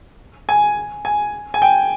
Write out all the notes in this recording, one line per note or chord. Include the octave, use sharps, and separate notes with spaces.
G#5
G#5
G#5
G5